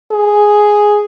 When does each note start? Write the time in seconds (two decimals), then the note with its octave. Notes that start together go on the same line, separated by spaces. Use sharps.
0.12 G#4